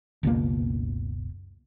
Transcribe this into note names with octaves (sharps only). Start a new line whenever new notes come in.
F#1 C#2 B2 A#3